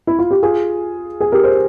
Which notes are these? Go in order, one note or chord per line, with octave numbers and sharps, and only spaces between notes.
E4
F4
G4
F4 G#4
G#4
G4 A#4
C5